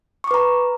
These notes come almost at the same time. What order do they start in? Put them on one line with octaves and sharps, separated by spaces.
C#6 D6 B4 A#5